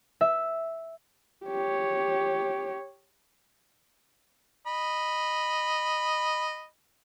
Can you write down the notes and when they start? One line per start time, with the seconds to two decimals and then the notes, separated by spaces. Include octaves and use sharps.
0.21 E5
1.46 G4 C#5
4.67 D#5 B5